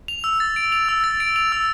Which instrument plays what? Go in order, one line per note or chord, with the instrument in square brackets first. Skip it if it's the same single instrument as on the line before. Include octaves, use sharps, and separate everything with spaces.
[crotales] F7
E6
A6
D7
F7
E6
A6
D7
F7
E6